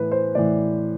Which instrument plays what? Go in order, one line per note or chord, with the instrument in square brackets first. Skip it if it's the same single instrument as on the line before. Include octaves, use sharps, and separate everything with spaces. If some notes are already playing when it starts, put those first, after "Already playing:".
Already playing: [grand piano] A2 E3 B4
C5
A2 E3 D5